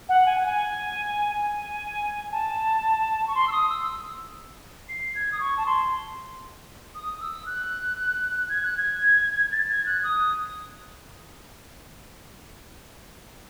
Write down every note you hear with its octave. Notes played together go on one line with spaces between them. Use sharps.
F#5
G#5
F#5
G#5
G#5
A5
C#6
C6
E6
D#6
E6
C7
G#6
D#6
C#6
A5
C6
D#6
E6
F#6
G#6
F#6
G#6
A6
G#6
F#6
D#6